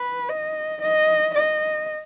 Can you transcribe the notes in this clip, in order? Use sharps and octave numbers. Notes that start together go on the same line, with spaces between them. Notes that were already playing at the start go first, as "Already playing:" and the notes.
Already playing: B4
D#5
D#5
D#5